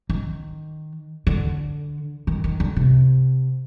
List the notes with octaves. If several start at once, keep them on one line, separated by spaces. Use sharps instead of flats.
D#3
D3
D#3
D#3
D3
C3